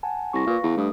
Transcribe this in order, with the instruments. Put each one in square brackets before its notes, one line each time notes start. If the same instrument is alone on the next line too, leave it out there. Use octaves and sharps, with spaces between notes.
[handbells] F#5 G#5 A5
[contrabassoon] C2 [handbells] C#6 A#6
[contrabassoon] A#2 [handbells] B4 F5
[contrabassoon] E2
[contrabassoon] G2 [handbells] A3 D#6